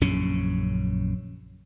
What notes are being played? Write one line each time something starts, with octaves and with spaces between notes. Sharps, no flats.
A#1 F#2 C#3 C#4